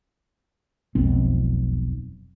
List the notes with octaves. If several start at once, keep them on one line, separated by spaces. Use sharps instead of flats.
E1 B1 F2 C4